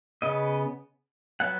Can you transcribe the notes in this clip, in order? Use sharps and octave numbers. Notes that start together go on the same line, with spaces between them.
C#3 B3 D#5
F#3 B3 F#5